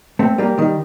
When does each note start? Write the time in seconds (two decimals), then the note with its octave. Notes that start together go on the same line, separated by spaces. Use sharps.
0.19 A3 C4
0.38 G3 A#3
0.58 D#3 G3